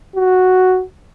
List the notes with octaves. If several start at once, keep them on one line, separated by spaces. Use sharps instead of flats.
F#4